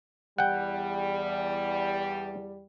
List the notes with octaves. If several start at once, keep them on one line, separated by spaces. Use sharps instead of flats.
E2 G3 F#5 G5